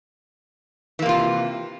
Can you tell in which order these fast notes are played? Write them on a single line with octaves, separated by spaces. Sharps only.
E3 A#3 C3 F4